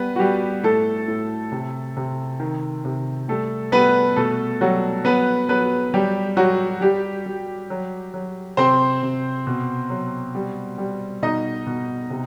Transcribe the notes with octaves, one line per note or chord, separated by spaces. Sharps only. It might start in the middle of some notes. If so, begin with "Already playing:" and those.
Already playing: G3 B3 B4
F#4
G3 G4
A2 A3 A4
A2
C3
C3
D#3
C3
G3 A3 A4
G3 B3 B4
B2 A3 A4
F#3 G3 F#4
F#3 B3 B4
F#3 B3 B4
F#3 G3 G4
F#3 F#4
G3 G4
G3
F#3
F#3
C3 C4 C5
C3
B2
F#3
G3
G3
B2 D#4 D#5
B2
C3